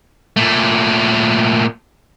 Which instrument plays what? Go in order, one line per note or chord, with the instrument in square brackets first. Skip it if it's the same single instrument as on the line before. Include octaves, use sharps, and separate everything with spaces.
[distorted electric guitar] A#2 A3